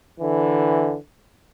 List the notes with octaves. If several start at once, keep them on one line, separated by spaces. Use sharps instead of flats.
D3 E3